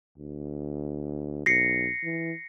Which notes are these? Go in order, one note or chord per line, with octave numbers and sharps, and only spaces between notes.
D2
B1 A#6 C7 C#7
E3